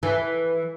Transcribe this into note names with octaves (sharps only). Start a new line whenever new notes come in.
E3